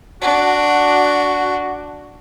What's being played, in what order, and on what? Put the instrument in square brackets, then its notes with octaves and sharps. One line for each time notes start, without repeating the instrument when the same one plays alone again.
[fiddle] D4 [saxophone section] F#4